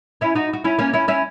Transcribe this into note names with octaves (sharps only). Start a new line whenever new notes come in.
C#4 E4
D#4 F#4
F#4
C#4 E4
A#3 C#4
C#4 E4
C#4 E4